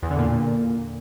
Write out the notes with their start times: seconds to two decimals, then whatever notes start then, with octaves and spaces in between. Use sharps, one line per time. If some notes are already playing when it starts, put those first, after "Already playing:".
0.02 E2
0.10 D3
0.18 A#2